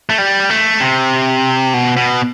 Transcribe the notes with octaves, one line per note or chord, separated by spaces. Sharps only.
A3
G3
A3
C3
B2
B2